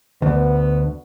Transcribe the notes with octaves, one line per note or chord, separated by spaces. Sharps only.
D2 B3